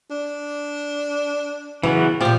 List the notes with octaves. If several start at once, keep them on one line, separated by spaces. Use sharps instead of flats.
D4
C#3 E3 F#3 B3
A#2 F3 C4 G4